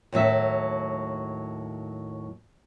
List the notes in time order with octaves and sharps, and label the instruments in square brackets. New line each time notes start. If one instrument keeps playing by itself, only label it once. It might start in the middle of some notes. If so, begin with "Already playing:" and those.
[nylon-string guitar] D#2 A2 F#3 E5